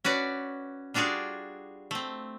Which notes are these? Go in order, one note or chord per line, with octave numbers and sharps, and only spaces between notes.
C#4 F#4 B4 D5
G3 D4 F4 F#4 G#4 D5
A3 C4